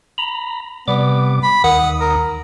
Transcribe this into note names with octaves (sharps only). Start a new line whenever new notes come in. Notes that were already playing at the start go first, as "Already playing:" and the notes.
A#5 B5
C3 G3 B3 D6
B5
D#2 D#3 F#5 D#6
A#4